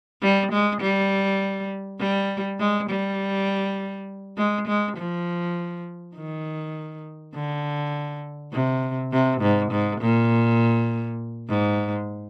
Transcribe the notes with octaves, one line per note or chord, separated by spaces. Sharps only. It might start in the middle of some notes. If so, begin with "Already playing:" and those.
G3
G#3
G3
G3
G#3
G3
G#3
G#3
F3
D#3
D3
C3
C3
G#2
G#2
A#2
G#2